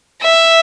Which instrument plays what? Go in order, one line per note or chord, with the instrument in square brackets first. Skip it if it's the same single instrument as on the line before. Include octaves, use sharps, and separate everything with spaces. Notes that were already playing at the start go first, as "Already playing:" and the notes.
[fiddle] E5